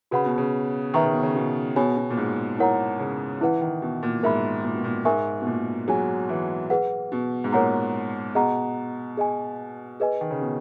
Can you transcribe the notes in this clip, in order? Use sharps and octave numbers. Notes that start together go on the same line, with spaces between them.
C#3 F#4 B4 F#5 B5
B2
C#3
D#3 B4 E5 A#5 C#6
C#3
B2
C#3
B2
B2 G#4 C#5 G#5 B5
B2
A#2
G#2
E4 A#4 C#5 F#5 A#5
C#3
E3 E4 B4 F#5
D#3
B2
A#2
G#2 A#4 E5 B5
A#2
B2
A#2
G#2 A#4 E5 G#5 C#6
B2
A#2
F#3 G#4 C#5 G#5
E3
G#4 B4 F#5
B2
G#2
A#2 A#4 C#5 F#5 A#5
B2 G#4 D#5 F#5 A#5
G#4 D#5 G#5
G#4 B4 D#5 G#5
D#3
C#3
B2